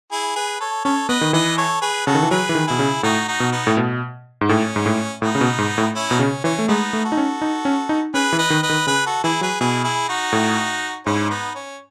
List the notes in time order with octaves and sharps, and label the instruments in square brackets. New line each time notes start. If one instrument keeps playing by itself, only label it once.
[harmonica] E4 G#4
G#4 B4
A4 C#5
[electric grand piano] C#4 [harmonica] A4 C#5
[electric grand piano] B3 [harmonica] B4 D#5
[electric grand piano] D#3
[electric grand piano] E3 [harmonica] B4 D#5
[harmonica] A4 C#5
G#4 B4
[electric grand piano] C#3 [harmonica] F#4 A4
[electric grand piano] D#3
E3
[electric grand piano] F#3 [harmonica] G#4 B4
[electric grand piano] E3
D#3
[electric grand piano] B2 [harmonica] E4 G#4
[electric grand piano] C#3
[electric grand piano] A2 [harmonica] D#4 F#4
[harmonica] D#4 F#4
[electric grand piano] B2
[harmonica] B3 D#4
[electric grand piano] A2
B2
G#2
[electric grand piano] A2 [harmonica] C#4
[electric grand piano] G#2
A2
[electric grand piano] A2 [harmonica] B3 D#4
[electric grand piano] C#3
B2
G#2
A2
[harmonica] C#4 E4
[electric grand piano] B2 [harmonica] D#4
[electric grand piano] C#3 [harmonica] C#4
[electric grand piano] E3 [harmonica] C#4
[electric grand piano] A3
[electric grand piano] G#3 [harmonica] B3 D#4
[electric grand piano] A3
[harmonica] F#4 A4
[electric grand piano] D#4
C#4
D#4
C#4
D#4
[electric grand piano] C#4 [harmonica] G#4 B4
[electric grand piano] E3
[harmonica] B4 D#5
[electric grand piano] D#3
[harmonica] B4 D#5
[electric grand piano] D#3
[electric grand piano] C#3 [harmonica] G#4 B4
[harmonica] F#4 A4
[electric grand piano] E3 [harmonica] E4 G#4
[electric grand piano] F#3 [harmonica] G#4 B4
[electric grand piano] B2 [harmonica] E4 G#4
[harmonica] E4 G#4
D#4 F#4
[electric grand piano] A2
[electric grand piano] G#2 [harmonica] C#4 E4
[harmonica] B3 D#4
C#4